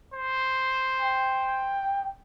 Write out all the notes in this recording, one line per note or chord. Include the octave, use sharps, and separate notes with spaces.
C5
G5